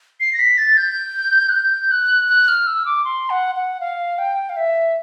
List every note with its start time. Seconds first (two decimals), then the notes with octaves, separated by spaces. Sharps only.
0.20 C7
0.33 A#6
0.39 B6
0.58 A6
0.77 G6
1.49 F#6
1.53 G6
1.91 F#6
2.28 F#6
2.48 F6
2.67 E6
2.86 D6
3.05 C6
3.30 F#5
3.55 F#5
3.80 F5
4.18 G5
4.49 F5
4.56 E5